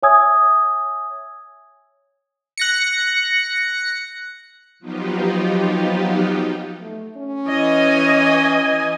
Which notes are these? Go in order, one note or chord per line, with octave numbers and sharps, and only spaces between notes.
C#5 E5 G#5 D#6 E6 G#6
F#6 A#6 C#7
F3 F#3 B3 D#4 F4 G4
A3
C#4
E3 D#5 G#5